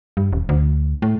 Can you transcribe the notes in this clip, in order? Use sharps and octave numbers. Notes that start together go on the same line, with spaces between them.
G2
D#1
D2
A2